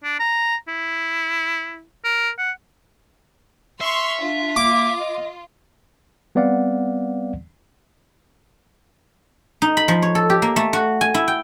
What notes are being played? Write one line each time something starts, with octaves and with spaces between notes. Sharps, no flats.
D4
A#5
E4
A#4
F#5
E5 C6 C#6 F6
D4 F4
A#3 D6
D#5
G3 B3 C4 D5 F5 F#5
D#4
B5
F3
C#5
A4
G4
A#3
A3
F#4
G#5
E4
G5